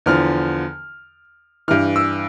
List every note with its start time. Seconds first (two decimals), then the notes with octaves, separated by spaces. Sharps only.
0.06 E2 D3 F3 F6
1.68 G2 E3 F6
1.96 E6